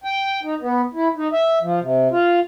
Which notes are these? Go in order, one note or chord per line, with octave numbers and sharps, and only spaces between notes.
G5
D#4
B3
E4
D#4
E5
F3
C3
F4